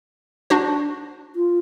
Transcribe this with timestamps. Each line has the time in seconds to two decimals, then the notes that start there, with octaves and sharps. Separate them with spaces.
0.50 D4 F#4 C5
1.36 F4